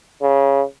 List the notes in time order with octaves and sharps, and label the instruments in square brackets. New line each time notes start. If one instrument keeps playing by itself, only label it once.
[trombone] C#3